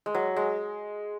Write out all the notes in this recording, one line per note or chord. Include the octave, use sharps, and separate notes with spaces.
G#3
F#3
G#3